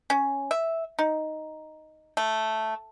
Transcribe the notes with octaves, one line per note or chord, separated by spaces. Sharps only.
C#4
E5
D#4
A3